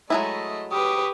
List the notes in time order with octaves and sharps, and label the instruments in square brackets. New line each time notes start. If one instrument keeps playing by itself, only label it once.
[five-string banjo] F#3 G#3 E4 [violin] A3 E5 [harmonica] D#5
[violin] G4 B4 [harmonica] C#6 D#6